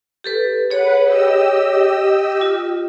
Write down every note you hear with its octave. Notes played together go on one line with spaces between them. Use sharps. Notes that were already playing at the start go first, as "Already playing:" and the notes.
G4 A4 B4
G#4 B4 C#5 F#5
G4 D#5 E6
F4